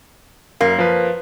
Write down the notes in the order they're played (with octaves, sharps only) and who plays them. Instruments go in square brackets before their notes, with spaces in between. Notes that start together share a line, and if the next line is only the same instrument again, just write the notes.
[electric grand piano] F#2 [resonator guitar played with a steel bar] A#3
[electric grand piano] F3 B4